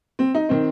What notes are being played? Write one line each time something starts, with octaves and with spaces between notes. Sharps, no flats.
C4
D#4
D#3 C4